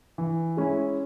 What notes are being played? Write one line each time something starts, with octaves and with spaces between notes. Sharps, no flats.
E3
G#3 C#4 E4